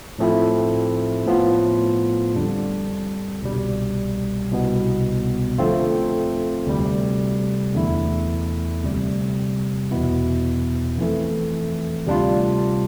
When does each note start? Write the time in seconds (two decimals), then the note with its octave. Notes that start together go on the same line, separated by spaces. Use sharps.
0.19 A2 F3 A3 C4 E4
1.26 A2 F3 B3 F4
2.35 F2 D3 G3 D4
3.42 C2 B2 G3
4.51 C2 B2 B3
5.58 F2 D3 A3 C4 F4
6.67 D2 C3 G3
7.74 E2 D3 A3 E4
8.83 D2 C3 G3
9.91 E2 B2 B3 E4
10.98 F2 E3 A3
12.06 D2 C3 G3 D4 F4